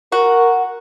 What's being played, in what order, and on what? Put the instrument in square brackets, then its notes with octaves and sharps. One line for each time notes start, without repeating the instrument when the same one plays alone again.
[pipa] F#4 [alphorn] A#4